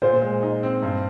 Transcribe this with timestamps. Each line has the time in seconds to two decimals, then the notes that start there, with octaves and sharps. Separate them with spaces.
0.02 A#2 C5
0.22 G#3
0.43 D#4
0.63 C4
0.83 G2